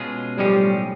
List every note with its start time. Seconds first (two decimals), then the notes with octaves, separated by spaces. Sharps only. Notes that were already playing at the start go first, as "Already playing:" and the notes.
Already playing: B2 G#3 C#4 F4 G#4
0.38 B1 A2 F3 G3 G#3 C#4